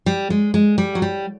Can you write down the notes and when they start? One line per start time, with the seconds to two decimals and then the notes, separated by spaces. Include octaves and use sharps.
0.06 G3
0.30 G#3
0.54 G#3
0.78 G3
0.95 F#3
1.02 G3